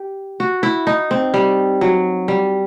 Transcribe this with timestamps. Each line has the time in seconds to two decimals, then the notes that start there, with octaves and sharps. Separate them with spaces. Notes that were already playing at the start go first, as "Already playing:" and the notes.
Already playing: G4
0.40 F#4
0.63 E4
0.87 D#4
1.11 C4
1.34 G3
1.81 F#3
2.28 G3